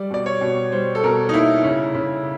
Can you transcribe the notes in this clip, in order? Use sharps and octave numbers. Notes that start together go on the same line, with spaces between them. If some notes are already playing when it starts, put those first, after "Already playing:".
Already playing: G3 D5
B2 D5
C#5
B2
G3 C5
A4
B2 A#4
D#4
A#3 E4
C#3
C#3